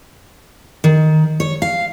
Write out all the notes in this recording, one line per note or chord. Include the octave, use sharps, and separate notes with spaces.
D#3
C#5
F5